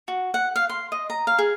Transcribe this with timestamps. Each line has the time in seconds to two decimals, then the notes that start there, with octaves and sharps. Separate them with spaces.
0.08 F#4
0.34 F#5
0.56 F5
0.69 C6
0.92 D#5
1.10 A#5
1.27 F5
1.39 G#4